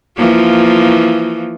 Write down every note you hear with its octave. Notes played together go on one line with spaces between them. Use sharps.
E3 F3 A#3